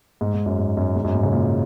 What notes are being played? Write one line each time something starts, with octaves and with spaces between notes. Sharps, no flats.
G#2
G#2
F#2
G#2
F#2
G#2
F#2
G#2
C#3
A#2